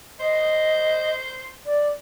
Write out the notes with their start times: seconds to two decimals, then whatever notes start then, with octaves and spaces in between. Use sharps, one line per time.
0.20 C5 D#5
1.66 D5